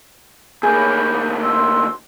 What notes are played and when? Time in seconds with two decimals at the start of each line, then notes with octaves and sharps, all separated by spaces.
0.63 D2 A#3 G#4 C#5 B5 G6
1.42 C6 E6